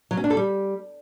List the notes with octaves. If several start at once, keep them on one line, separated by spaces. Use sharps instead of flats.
F#3
C#4
D4
A4
G3